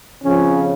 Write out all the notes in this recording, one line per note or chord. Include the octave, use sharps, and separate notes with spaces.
F2 C#3 F3 C#4